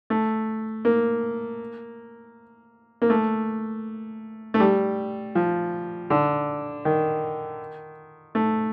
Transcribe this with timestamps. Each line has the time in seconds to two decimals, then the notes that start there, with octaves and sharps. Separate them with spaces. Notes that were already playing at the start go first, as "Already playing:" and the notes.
0.10 A3
0.85 A#3
3.02 A#3
3.10 A3
4.54 A3
4.60 G3
5.35 F3
6.10 D3
6.85 D#3
8.35 A3